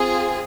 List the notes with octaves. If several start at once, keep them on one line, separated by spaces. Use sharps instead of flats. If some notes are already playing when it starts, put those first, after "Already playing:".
Already playing: C4 F4 G#4